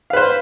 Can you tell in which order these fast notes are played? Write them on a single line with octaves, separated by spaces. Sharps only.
F5 B4 C5